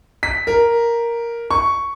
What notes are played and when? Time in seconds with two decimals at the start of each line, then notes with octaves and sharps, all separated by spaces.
0.23 B6
0.47 A#4
1.51 C#6